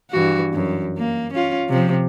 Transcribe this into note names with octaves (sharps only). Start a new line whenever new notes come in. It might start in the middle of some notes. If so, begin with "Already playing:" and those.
G2 E3 F#4
F#2
A#3
C#4 F4
C3 F3